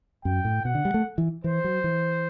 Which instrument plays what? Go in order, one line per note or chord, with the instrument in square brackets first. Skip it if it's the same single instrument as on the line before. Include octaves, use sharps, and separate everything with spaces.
[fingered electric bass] F#2 [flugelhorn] G5
[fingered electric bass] A2
[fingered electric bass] B2 [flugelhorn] F#5
[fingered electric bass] D3
G3
A3
E3
[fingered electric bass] E3 [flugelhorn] C5
[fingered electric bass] F#3
E3